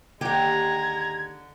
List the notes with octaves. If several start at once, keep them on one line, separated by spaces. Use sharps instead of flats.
D#2 D3 G#3 G4 A#5 G#6